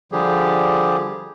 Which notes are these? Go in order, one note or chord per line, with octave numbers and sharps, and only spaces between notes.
D3 F3 G3 G4 G#4